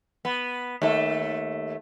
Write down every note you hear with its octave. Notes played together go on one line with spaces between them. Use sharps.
B3
D#2 A3